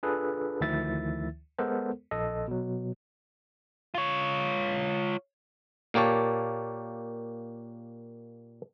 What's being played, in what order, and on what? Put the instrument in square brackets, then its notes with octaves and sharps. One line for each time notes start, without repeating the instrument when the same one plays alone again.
[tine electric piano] D4 F4 G#4 A4 B4
D2 D#3 F3 E4 E5 A6
G#3 B3 A4 A#4 C5
A#1 A4 D#5
B2 F#3
[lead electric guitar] F4 C#5
[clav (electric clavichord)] A#2 A#3 G4 C#5 A5